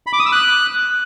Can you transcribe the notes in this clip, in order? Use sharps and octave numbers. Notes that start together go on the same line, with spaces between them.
B5
D6
D#6
E6
F#6